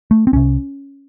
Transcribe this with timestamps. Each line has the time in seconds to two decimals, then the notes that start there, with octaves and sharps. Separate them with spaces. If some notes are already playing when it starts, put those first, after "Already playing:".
0.11 A3
0.27 C4
0.33 C2 C3 C#4